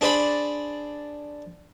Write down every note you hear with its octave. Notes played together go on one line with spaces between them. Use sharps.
D4 G#4 C5 D5 B5